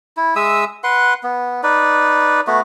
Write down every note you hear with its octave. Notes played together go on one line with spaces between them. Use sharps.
E4
G#3 E5 D#6 E6
B4 F#5 C6
B3
D#4 B4 D5
A3 B3 F#4